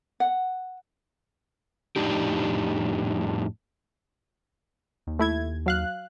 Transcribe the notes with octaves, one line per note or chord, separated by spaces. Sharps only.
F#5
F2 A2 D4 D#4 G4
D#2
A3 E4 G#6
F#3 F5 F#6